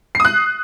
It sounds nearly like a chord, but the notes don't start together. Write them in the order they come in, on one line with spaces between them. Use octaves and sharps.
C7 D#6 F#6